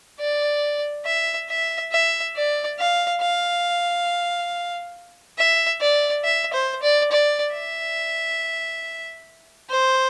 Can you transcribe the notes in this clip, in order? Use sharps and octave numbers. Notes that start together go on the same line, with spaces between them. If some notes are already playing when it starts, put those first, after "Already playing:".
D5
E5
E5
E5
D5
F5
F5
E5
D5
E5
C5
D5
D5
E5
C5